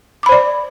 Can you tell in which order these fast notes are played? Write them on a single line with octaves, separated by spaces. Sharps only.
D6 B5 C5 D5